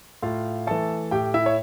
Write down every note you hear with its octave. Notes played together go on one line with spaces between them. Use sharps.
A2 F4 F5
E3 A3 A4 A5
A2 G4 G5
E4 E5
C#5